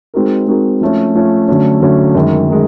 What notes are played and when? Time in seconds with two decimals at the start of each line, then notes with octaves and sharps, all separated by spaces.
0.14 G#3 C4 D#4 F#4 A#4
0.47 G#3 C4 D#4 F#4 A#4
0.81 F3 A3 C#4
1.15 F3 A3 C#4
1.48 D3 F#3 A3 C#4
1.82 D3 F#3 A3 C#4
2.14 F#2 D#3 G#3
2.50 D#3 G#3